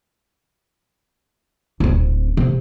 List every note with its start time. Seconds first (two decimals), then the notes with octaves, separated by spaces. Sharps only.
1.80 D1 C4
2.37 C3